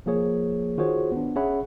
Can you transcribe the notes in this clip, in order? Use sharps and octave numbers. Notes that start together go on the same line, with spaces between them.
F3 A#3 G#4 C#5
D#3 F4 F#4 G#4 C5 C#5
B3 D4
C#4 G#4 C#5 E5 F#5 B5